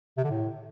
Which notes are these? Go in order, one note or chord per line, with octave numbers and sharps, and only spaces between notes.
C3
D3
A2